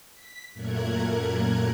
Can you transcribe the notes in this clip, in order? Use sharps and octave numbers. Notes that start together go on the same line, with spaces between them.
B6
F#2 A#2 A3 A#4 F#6 G#6